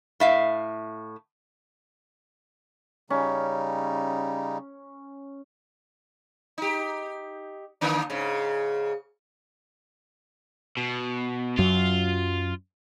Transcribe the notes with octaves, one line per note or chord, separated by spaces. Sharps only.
A2 E5 F5
C#3 G3 C#4 D#4
D#4 G4
D3 A#3 D4
G#2 C#3
B2
F#2 F#3 F4